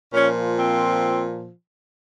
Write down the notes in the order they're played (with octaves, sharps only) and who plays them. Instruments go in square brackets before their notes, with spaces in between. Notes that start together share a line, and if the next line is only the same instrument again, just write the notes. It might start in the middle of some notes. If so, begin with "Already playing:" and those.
[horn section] A#2 F3 C#4
C4